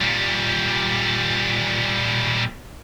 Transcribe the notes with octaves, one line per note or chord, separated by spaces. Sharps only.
A#2 G3